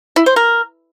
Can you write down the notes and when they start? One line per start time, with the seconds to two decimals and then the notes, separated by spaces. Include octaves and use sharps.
0.16 E4
0.26 C5
0.36 A#4